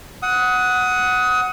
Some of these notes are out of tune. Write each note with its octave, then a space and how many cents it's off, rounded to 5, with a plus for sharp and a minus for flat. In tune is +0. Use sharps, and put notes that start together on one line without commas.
F#5 +0 D#6 +25